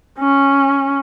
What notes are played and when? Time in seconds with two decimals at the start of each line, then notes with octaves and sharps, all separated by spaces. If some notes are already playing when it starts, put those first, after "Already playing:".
0.19 C#4